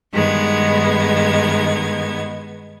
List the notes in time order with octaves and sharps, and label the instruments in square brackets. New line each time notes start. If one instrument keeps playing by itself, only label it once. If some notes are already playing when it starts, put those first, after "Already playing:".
[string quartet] G2 D#3 G#3 B3 G#6